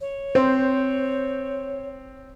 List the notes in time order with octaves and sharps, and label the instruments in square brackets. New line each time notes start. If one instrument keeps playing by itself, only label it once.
[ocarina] C#5
[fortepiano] C4 [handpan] C5